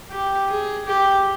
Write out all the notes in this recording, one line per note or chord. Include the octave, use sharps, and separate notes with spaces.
G4
G#4
G4